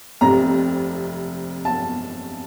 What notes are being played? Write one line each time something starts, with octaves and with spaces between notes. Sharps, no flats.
F1 F2 C3 A#5
A5